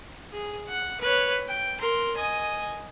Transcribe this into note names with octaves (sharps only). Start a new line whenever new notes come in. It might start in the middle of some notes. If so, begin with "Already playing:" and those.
G#4
F#5
B4 C#5
G5
A#4 C6
D#5 G#5